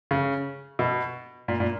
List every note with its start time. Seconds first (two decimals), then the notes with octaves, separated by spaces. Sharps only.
0.11 C#3
0.79 B2
1.48 A#2
1.60 A#2